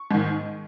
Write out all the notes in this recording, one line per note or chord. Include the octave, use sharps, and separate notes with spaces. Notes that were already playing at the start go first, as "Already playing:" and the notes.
Already playing: C#6
G#2 D#3